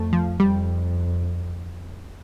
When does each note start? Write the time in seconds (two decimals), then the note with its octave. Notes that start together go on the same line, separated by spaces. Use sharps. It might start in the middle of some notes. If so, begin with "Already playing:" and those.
Already playing: F2 A3
0.13 F3
0.39 F2 G3